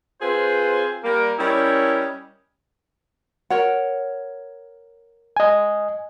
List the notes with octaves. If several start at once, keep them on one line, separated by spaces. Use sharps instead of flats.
C4 F4 G#4 B4 C5
G3 A#3 A#4
G3 C#4 E4 A#4 C#5 D#5
A#4 C#5 F#5
D#5 G#5